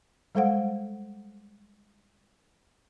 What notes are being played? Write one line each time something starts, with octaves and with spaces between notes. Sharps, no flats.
G3 G#3 A4 C5 F5 F#5